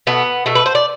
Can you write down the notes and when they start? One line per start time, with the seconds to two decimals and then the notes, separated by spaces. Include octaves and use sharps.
0.07 B2 A3 B3
0.46 B2 A3
0.55 B4
0.66 C5
0.75 D5